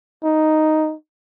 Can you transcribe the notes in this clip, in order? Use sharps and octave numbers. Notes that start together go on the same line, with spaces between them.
D#4